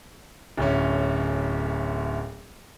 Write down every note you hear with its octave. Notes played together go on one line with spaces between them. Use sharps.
D1 D2 C#4